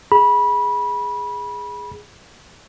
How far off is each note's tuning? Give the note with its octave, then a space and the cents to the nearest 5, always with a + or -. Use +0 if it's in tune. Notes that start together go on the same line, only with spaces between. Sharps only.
G#4 +0 B5 -20